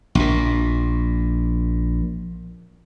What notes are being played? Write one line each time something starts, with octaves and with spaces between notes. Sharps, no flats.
A#1 A#2